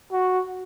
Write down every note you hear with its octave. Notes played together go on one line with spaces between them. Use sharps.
F#4